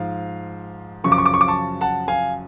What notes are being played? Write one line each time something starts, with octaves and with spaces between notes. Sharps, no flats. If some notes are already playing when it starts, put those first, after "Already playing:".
Already playing: G#2 F3 F5
F#2 C#3 F3 C#6
D6
C#6
D6
C#6
D6
A5 C#6
F#5 A5
F5 G#5